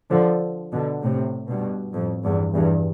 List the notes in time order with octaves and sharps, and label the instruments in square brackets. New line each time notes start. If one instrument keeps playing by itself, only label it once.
[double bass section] D3 F3
B2 D3
A2 C3
G2 B2
F2 A2
E2 G2
E2 G2